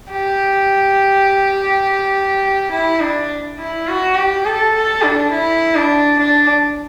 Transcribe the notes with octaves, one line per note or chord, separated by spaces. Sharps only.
G4
E4
D4
E4
F#4
G4
A4
A4
D4
E4
D4
D4